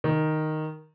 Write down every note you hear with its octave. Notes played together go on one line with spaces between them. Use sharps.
D#3